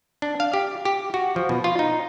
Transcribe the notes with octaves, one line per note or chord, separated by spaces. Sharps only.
D4
F5
G4
G4
F#4
F3
B2
F4
D#4